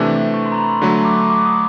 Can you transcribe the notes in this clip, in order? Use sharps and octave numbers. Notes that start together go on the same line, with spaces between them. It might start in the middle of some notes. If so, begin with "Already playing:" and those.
Already playing: C3 E3 A3 D4 G4
C#6
C6
A#5
B5
C6
D3 F#3 A3 C#6
D6
D6
D#6